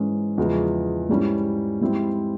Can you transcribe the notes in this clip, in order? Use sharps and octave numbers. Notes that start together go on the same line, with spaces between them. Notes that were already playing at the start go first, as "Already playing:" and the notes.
Already playing: G#2 E3 G#3 C#4
E2 C#3 F3 G#3
G#2 G3 C#4 E4
G#2 G3 C4 E4